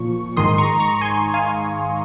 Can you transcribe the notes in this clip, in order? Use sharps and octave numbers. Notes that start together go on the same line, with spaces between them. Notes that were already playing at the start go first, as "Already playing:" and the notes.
Already playing: A#2 F3 C#6
G#2 D#3 C6 D#6
A#5 C#6
A#5 C#6
G#5 C6
F5 G#5